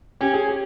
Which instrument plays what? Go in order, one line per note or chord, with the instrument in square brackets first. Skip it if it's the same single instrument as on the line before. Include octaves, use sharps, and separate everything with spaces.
[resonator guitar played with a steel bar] C#4 [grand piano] G4
[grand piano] G#4
G4